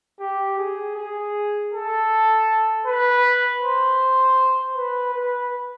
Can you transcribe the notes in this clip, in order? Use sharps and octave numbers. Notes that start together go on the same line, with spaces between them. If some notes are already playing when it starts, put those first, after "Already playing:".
G4
G#4
G#4
A4
B4
C5
B4
B4